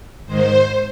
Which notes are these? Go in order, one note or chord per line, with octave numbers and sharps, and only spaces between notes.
G#2 D#3 G#3 C5